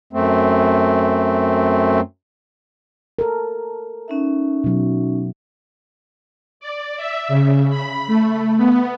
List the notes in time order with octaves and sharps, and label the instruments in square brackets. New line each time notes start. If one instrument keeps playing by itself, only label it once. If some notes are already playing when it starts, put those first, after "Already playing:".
[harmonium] F#2 A3 C4
[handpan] A4 A#4
[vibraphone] C#4 D#4 E5
[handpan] B2 F#3
[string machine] D5
E5
C#3
B5
A3
B3